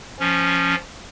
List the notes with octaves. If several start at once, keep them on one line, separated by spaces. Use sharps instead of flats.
F3 C#4